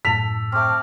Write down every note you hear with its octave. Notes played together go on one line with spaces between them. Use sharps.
F#2 A2 A4 B6 F7
A3 C4 G5 D6 F6